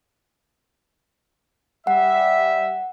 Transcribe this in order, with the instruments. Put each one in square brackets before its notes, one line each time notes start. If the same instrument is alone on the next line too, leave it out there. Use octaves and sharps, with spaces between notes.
[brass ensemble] G3 E5 [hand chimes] F#5